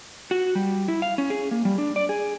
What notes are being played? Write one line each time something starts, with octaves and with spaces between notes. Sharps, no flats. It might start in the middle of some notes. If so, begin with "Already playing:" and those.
F#4
G3
E4
F5
C#4
G#4
A#3
G3
D4
D5
G#4